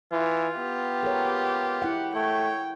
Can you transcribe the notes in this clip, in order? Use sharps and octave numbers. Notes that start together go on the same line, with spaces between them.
E3 F4
B3 G4
G#4 A#4 C#5
E4 F#5
A3 C#5 G5